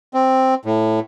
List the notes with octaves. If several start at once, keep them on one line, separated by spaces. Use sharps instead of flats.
C4
A2